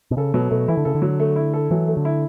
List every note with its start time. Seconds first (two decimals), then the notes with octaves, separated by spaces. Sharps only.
0.11 B2
0.17 C#3 A4
0.34 B2 F#3
0.51 B2 A3
0.68 E3 E4
0.77 D3
0.85 C#3 A4
0.95 D3
1.02 F#3
1.20 A3
1.36 E4
1.54 A4
1.71 E3 F#3
1.88 A3
1.97 D3
2.05 E4